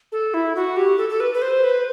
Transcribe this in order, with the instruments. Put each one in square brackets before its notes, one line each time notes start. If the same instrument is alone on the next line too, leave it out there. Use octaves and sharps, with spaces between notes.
[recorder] A4
E4
F#4
G4
A4
A4
B4
B4
C5
B4